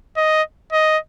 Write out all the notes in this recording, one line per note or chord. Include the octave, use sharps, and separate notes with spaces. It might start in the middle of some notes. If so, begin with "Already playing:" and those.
D#5
D#5